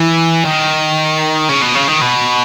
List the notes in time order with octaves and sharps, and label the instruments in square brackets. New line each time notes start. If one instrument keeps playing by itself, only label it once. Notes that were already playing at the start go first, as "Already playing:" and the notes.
Already playing: [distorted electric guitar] E3
D#3
C#3
B2
C#3
D#3
B2